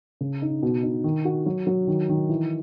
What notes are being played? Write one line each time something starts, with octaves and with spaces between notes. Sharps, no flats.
C#3
D#4
B2
D#4
D#3
F#4
F#3
F#3
D#3
D#3
E3